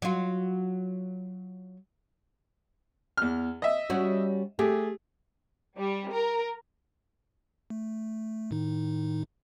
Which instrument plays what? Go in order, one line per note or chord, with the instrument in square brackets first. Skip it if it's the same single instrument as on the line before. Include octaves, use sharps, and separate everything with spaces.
[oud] F#3 F4
[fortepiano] E2 F6
D#5 E5
[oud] G3 C#4 F#4
[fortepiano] A3 G#4 [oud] G4
[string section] G3
A#4
[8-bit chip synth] A3
A2 D#3 D#4